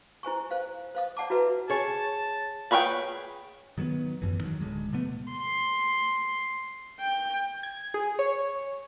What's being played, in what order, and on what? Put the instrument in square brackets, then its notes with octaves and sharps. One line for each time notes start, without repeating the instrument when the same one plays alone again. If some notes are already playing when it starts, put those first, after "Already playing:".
[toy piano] E4 C5 G#5 C#6
C5 F5
C5 F5 D#6
D5 F#5 A5 D6
E4 F#4 B4 E5
[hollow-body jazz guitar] G#4 C#5 [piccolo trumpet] A5
[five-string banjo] G#4 B4 C#5 F5 G5
[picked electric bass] D#3 F#3 G3 B3
A1 F#2 E3
D#3 F#3
D1 E2 D3 G#3
B2 F3 A3 B3
[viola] C6
G5
[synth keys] G#6
G#4
C#5